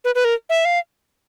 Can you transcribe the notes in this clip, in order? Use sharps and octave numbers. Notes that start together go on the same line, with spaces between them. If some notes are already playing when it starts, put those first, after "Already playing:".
B4
B4
A#4
E5
F5